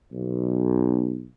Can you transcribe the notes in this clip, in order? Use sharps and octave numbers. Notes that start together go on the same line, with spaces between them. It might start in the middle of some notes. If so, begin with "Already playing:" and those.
B1